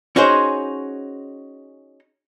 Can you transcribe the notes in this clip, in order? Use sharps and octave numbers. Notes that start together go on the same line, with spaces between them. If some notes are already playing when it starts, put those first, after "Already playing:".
C#4 D#4 F#4 G#4 C5